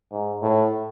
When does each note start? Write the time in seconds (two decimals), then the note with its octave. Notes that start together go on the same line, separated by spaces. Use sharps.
0.12 G#2
0.42 A2